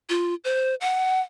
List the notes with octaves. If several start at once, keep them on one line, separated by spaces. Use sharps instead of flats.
F4
C5
F#5